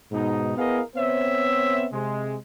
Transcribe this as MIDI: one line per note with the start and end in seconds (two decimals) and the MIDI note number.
0.11 0.55 44
0.11 0.55 47
0.11 0.55 63
0.57 0.81 59
0.57 0.81 64
0.57 0.81 68
0.57 0.81 70
0.57 0.81 75
0.57 0.81 77
0.96 1.85 59
0.96 1.85 60
0.96 1.85 72
0.96 1.85 73
0.96 1.85 76
1.92 2.35 48
1.92 2.35 56